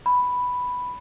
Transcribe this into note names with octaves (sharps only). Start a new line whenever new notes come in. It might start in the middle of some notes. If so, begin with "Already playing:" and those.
B5